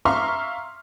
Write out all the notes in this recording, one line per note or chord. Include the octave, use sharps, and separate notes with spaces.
E5 F5 A#5 C6 C#6 F6